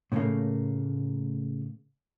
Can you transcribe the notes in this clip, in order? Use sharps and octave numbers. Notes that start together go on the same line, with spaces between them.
A2 C#3 F#3 A3 A#3